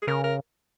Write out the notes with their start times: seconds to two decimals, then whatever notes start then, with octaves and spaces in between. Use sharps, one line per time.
0.02 G#4
0.07 C#3 A#4
0.24 A#4